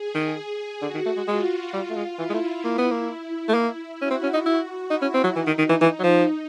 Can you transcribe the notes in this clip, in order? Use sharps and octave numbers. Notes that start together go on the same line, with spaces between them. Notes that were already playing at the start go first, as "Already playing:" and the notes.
Already playing: G#4
D#3
D3 F#4
D#3
A3
G#3
G#3 F4
G3
A3
G#3
E3 E4
G#3
A3
A#3
B3
A#3
A3
A#3
C#4 F#4
C4
C#4
D#4
E4
D#4 E4
C#4
C4
F#3
E3 D#4
D#3
D#3
E3
E3
F#3
F3